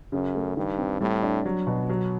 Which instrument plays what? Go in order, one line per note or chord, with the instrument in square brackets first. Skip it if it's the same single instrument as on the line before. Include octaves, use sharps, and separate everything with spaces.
[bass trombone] F#2 [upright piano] C#3
[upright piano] A3
[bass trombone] G2 [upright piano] D#3
[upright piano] C4
[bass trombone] A2 [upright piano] G3
[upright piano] D4
F#3
B2
F#3